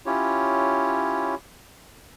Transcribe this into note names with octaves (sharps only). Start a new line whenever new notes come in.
C#4 E4 F4 G4 C#5